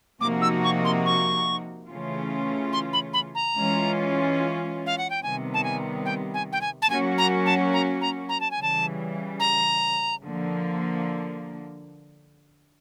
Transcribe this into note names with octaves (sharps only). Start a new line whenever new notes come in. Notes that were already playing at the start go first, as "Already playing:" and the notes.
C3 F3 A#3 D#4 F#4 D6
E6
C#6
C6
C#6
C#3 E3 A3 C#4 F4
C6
B5
B5
A#5
E3 G#3 C#4 F4
F5
F#5
G5
C3 D#3 G3 B3 G#5
A5
G#5
G5
G#5
G5
G#5
A5
F#3 A#3 C#4 F#4 G#5
A#5
A5
A#5
A#5
A#5
A5
G#5
C#3 E3 G3
A5
A#5
D3 F3 A#3